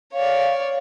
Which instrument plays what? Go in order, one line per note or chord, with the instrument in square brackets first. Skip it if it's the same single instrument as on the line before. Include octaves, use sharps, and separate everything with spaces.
[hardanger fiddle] C#5 D5 [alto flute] F5